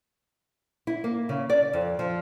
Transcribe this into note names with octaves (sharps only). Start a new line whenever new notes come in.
E4
A#3
C#3
D5
F2
F3